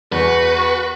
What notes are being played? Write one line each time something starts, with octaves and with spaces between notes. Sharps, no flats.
E2 F#4 B4